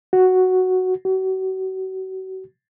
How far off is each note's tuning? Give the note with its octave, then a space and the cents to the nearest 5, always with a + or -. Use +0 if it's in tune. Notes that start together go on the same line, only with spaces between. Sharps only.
F#4 +0
F#4 +35